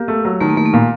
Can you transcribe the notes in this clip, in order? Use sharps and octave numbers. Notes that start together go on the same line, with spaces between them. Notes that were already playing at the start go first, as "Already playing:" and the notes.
Already playing: A#3 G4
A3
F#3
D#3 A3
A#3
D#3 A3
A#3
A#2